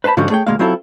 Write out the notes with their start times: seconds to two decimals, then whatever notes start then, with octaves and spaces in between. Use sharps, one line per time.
0.04 B4 C5 G#5 A5 B5
0.17 G#2 D3 F3 G3 C#4 F#4
0.30 A3 G#4 C#5 G5
0.47 D2 B2 G#3 A#3 F5
0.59 F#3 C4 E4 F4 A4